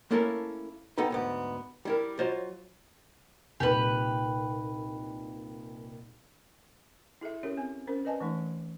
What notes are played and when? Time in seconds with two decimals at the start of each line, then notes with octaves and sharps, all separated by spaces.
0.11 A3 A#3 C#4 E4 A4 A#4
0.98 B3 C4 D#4 A4 B4
1.10 D2 G#2 B3
1.85 G3 E4 A#4
2.19 F#3 F4 C5 C#5 D#5
3.60 C2 A#2 D#3 G4 B4
7.21 E4 G#4 A4 E5
7.43 C#4 G4 A4 A#4 C#5
7.57 C4 G#5
7.87 C#4 A#4 C5
8.05 B4 D5 D#5 G#5 A5
8.20 E3 A3 D#4